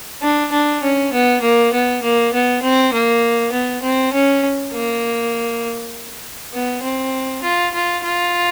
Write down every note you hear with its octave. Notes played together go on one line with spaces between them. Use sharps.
D4
D4
C#4
B3
A#3
B3
A#3
B3
C4
A#3
B3
C4
C#4
A#3
B3
C4
F4
F4
F4